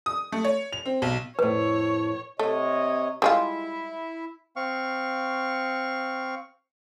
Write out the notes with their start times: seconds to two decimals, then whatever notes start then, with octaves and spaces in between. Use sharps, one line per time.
0.06 D#6
0.32 A3
0.45 C#5
0.73 F7
0.86 C4
1.02 B1
1.39 F2 A2 B4 C#5
2.39 C3 A3 C#5 D#5
3.22 G3 G#3 E4 F4 E5
4.56 C4 F5 C#6